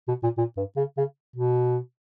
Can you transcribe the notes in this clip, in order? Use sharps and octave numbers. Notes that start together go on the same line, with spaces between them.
B2
A#2
A#2
G2
C#3
C#3
B2